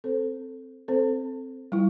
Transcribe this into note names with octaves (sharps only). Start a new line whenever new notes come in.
C4 A4 C5
C4 A4 C5
G3 E4